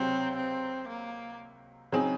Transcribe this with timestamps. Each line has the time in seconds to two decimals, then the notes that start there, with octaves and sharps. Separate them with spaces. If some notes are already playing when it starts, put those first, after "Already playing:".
Already playing: C#2 C3 F#3 C4
0.36 C4
0.88 A#3
1.92 C#3 F#3 C4 D#4 G#4